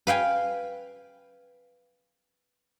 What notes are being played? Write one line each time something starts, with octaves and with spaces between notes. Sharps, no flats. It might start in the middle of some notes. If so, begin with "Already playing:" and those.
B4 F5 G5 G#5